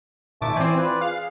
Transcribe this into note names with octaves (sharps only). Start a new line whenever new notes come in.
G#1 A#2 E5 A5 C#6 D6
E3 C4 C5 D5 G#5
F4 B4 D5
G#4 F5